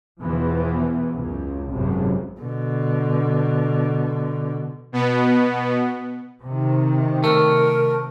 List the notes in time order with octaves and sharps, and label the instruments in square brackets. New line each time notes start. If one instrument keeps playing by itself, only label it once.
[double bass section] E2 B2 E3 F3 B3
C#2 F#2
G#1 C#2 F#2 C3
[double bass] B2 D3
[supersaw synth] B2 B3
[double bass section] C3 D#3
[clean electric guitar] A3 [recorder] A#4